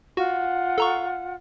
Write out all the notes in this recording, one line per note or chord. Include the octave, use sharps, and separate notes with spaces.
F4 F#4 F#5
A4 A#5 C#6